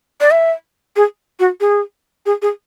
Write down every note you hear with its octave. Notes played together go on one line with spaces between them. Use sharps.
D5
E5
G#4
F#4
G#4
G#4
G#4